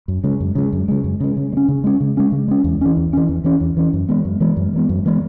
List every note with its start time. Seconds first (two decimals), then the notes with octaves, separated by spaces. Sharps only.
0.08 F#2
0.24 C#3 G#3
0.40 F#2
0.55 C#3 G#3
0.73 F#2
0.88 C#3 G#3
1.04 F#2
1.20 C#3 G#3
1.37 C#3
1.52 G#3
1.57 C#4
1.68 C#3
1.84 G#3 C#4
2.00 C#3
2.17 G#3 C#4
2.32 C#3
2.48 G#3 C#4
2.64 E2
2.81 E3 C#4
2.97 E2
3.13 E3 C#4
3.29 E2
3.44 E3 C#4
3.60 E2
3.77 E3 C#4
3.93 F#2
4.09 E3 G#3 B3
4.25 F#2
4.40 E3 G#3 B3
4.57 F#2
4.73 E3 G#3 B3
4.89 F#2
5.06 E3 G#3 B3